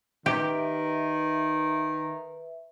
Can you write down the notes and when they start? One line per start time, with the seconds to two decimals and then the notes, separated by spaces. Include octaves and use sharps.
0.26 D#3 G4 B4 E5